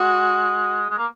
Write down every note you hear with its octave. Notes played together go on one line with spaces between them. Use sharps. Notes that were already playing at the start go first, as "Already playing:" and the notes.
Already playing: G#3 F#4
G#3
A#3